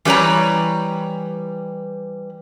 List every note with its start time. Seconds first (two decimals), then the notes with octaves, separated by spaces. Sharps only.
0.05 E3 G3 B4 C#5 A#5